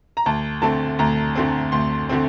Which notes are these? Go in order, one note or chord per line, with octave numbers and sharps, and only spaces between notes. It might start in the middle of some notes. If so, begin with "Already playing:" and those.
A#5
D2 A5
D3 A3 C4 A5
D2 A#5
D3 A3 C4
D2 C6
D3 A3 C4